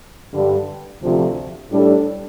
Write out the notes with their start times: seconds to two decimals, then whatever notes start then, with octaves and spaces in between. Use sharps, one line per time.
0.32 G2 D3 G3
1.01 D2 C3 F3
1.70 A2 G3 D4 A4